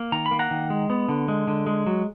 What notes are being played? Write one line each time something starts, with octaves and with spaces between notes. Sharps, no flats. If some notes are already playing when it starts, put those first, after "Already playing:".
Already playing: A#3
D#3 A#5
B5
A#3
F#5 A#5
D#3
G#3
B3
D3
G#3
D3
G#3
F#3